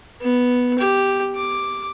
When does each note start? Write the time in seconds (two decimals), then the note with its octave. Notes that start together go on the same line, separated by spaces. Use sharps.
0.21 B3
0.78 G4
1.35 D6